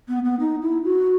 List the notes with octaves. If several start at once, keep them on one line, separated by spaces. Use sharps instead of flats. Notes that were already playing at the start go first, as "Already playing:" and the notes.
B3
B3
D#4
E4
F#4